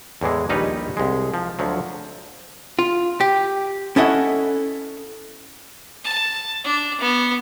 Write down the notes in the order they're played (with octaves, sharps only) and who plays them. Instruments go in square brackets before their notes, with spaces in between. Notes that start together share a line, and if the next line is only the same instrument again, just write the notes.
[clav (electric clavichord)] E2 A2 E3 G#3
A#1 D#2 G3 D#4 B4 C#5
C2 G#3
F3
D2 F3 F#3
[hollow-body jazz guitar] F4
G4
C#4 E4 A4 C#5 D#5 F#5
[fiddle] A5
D4
B3